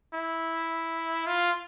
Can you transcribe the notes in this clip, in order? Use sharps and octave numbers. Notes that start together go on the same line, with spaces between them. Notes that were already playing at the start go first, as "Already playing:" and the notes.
E4
F4